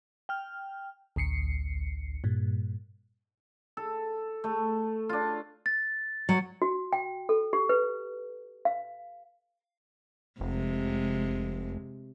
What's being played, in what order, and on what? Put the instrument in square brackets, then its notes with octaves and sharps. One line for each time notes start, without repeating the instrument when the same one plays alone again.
[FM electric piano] G5 F6
A1 D2 C7 C#7
G2 A#2
[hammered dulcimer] A4
A3
D4 F4
[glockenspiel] A6
[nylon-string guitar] F#3
[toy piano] F#4
G5
A4
G4
B4
F5
[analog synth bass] F1 [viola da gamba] C3 G#3